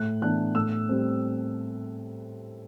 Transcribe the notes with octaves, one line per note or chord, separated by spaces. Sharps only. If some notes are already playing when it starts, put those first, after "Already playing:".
Already playing: A2 F#6
E3 B3 D4 F#6
A2 E6
G3 C4